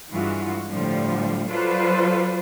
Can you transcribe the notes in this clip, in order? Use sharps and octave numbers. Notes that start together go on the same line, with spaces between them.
G2 E3 G#3 F4 F#4
A2 D3 F3 G3
F#3 F4 A4 B4 C5 D5